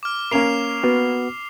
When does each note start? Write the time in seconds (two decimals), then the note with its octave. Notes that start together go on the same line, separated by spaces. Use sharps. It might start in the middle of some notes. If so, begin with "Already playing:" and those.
0.03 D6 F6
0.31 A#3 C#4 A#4 C7 F7
0.83 B3 F#4